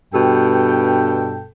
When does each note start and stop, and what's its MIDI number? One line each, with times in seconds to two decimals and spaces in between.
0.13 1.48 43
0.13 1.48 47
0.13 1.48 69
0.13 1.48 79